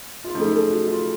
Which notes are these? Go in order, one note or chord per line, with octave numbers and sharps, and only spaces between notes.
F4
F#2 C#3 F3 A3 D#4
A4
F#4
F4